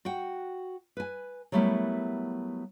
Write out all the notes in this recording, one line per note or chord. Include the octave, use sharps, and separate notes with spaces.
F#4 F#5 G5
B4 G#5
F#3 G3 A3 B3 E4 A#4